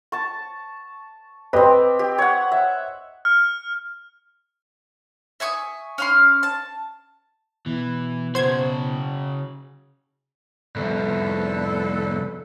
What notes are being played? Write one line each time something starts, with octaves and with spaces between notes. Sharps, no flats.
A5 C#6
C4 G4 B4 D#5
G4
C#5 F#5
E5
F6
E5 G#5 C#6 D#6
C#4 F5 C6
A5
B2 E3
C#3 F#4 C5 G#6
C2 F2 B3 D4 A4